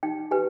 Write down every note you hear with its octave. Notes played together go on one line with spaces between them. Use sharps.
D#4 G5
G4 B4 G#5